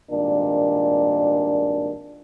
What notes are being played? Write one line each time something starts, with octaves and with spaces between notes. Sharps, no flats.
G#1 G2 A#2 D#3 D4